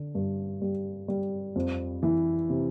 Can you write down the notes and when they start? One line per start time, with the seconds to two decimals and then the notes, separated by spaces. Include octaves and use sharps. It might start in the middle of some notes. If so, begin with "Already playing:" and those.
Already playing: D3
0.15 G2
0.62 G3
1.08 G3
1.56 F2
2.03 E3
2.50 C3